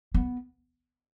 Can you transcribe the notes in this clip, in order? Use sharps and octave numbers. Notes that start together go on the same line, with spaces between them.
B3